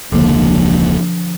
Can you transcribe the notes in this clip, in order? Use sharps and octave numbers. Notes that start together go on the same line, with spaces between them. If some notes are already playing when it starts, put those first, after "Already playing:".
E1 C#2 D3 F3 A#3